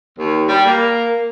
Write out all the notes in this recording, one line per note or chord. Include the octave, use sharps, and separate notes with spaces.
D#2
G3
A#3